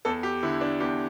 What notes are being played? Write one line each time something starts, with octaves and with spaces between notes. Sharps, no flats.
E2 A4
G4
D3 E4
D4
E2 G4